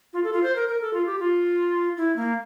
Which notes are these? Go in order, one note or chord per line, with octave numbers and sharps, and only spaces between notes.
F4
A4
F4
C5
A#4
A#4
A4
F4
G4
F4
E4
A#3